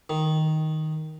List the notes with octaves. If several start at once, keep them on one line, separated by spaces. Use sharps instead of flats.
D#3